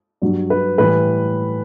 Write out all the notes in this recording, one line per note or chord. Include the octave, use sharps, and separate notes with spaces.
G2 F#3
B4
A2 E3 G3 B4